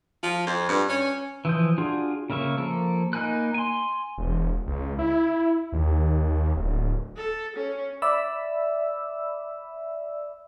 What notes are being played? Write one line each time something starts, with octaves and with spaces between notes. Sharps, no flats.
F3
F2
G2
C#4
E3 F3 D#6 G6
D4 F4 F#4 G#4
C#3 A#3 E5 C#6
F3 A#3 A4
A#3 D#4 G#5 B5 F#6
G#5 C6
E1
C#2
E4
D#2
D1
A4
C#4
D5 E5 B5 E6